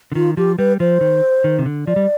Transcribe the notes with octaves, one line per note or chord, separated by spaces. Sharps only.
D3
D#3 F4
F3 G4
G3 B4
F3 C5
D#3
D#3
C3
D3
F3 D5
G3